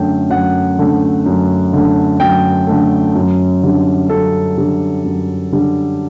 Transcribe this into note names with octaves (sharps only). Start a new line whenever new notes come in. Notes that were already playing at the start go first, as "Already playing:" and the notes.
Already playing: F#2 D3 A3 G5
F#2 F#5
D3 A3
F#2
D3 A3
F#2 G5
D3 A3
F#2
D3 G3
F#2 A4
D3 G3
F#2
D3 G3